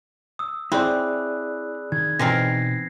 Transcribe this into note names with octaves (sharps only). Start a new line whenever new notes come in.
D#6 E6
C4 E4 G#4 C#5 D5 B5 F#6
D#3 G#6
B2 E3 C4 D#4 A#4 A#6 C7